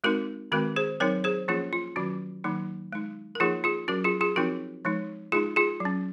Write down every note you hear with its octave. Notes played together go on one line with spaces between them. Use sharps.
G#3 C4 D#4 F#4 A#4
D#3 G#3 C4 F#4 A#4
G#4 C5
F#3 C4 D#4 A#4 C#5
G#4 C5
F3 A#3 C#4 F4 G#4
F4
D#3 F#3 C#4 F#4
D#3 F#3 A#3 D#4
G#3 D#4
A#4
F3 A#3 D#4 F4 G#4
F4 G#4
F#3 C#4 F#4 A#4
F4 G#4
F4 G#4
F3 C4 D#4 F#4 A#4
F3 G#3 D#4
G#3 D#4 F4 G#4
F4 G#4
F#3
C#4